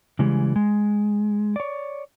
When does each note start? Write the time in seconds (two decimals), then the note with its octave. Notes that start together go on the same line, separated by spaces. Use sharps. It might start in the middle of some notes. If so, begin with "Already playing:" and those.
0.19 C#3 E3 G3 G#3
0.56 G#3
1.56 C#5 D5